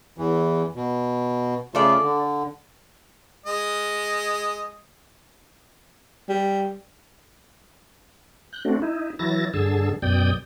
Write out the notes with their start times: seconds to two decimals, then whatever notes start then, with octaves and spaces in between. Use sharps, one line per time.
0.18 E2 E3
0.76 B2
1.75 C#3 A3 F4 A4 D5
2.03 D3
3.46 G#3 D#5
6.29 G3
8.53 F#6 G6
8.65 A3 C4 D4 F#4
8.82 D#4 E4
9.19 E3 F#3 E4 A6 A#6
9.54 G2 D3 G#4 A5 E6
10.02 F#2 B2 D5 G5 D#6 G6